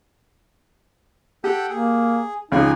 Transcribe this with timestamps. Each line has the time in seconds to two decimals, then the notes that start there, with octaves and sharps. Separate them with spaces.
1.44 G4 A4 F#5 G5
1.70 A#3 G#4
2.52 C#2 C#3 G#3 D#4 G4 G#5